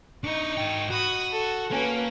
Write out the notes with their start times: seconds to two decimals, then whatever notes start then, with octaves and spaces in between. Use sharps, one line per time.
0.24 D4 D#4 D#5 C#6
0.57 G#2 G5
0.90 F#4 B5 D#6
1.32 A4
1.71 A#3 C#4 B4